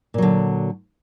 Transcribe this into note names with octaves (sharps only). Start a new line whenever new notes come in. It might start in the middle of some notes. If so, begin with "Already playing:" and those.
A#2 D3 F#3